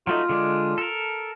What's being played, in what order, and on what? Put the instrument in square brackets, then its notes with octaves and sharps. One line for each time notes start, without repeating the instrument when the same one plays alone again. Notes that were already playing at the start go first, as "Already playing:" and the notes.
[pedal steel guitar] F#3 A3 D#4 [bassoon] F4
[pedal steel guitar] D3 G#3 D4
A4 A#4